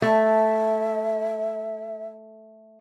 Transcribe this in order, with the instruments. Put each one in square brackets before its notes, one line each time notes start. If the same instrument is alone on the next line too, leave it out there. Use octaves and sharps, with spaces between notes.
[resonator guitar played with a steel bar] A3 [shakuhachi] E5